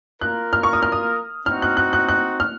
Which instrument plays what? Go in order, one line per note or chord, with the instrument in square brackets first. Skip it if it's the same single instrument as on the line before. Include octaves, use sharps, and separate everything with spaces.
[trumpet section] A#3 F4 A#4 [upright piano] F#6
[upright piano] F6
C#6
D#6
F6
D#6
[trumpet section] C4 D#4 F#4 [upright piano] F6
[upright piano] F#6
F#6
F#6
F#6
F6